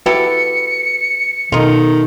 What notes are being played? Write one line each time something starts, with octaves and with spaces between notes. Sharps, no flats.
E4 F#4 G4 A4 B4 C#7
B2 D#3 C#4 D#4 F4 A4